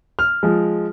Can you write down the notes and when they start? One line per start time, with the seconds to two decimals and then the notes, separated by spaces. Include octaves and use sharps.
0.19 F6
0.43 F3 G#3